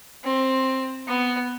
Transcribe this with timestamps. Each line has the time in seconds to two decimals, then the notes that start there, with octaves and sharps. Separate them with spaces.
0.24 C4
1.07 B3